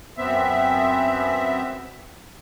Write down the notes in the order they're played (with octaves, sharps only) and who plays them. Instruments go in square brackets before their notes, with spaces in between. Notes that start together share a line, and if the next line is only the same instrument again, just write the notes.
[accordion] F#2 B3 C4 E5